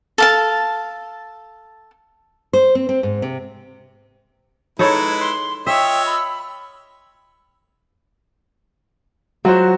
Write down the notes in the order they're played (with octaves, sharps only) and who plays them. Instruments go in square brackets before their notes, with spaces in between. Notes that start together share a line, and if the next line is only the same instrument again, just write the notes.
[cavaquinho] A4 F5 A5
[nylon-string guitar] C5
C4
C4
G#2
C3
[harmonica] G#3 E4 B4 [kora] D#4 A4 C#5
[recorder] C6
[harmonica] F4 C#5 D#5 [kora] E5 [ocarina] G5 [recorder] E6
[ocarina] B5
[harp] F#3 [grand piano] F4 F#4 C5